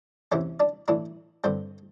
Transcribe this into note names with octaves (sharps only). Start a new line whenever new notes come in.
E2 C3 E3 C#4 C#5
D4 D5
A2 E3 D4 D5
G2 D3 C4 C5